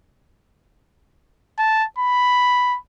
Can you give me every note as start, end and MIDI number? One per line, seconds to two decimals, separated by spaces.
1.59 1.85 81
1.98 2.78 83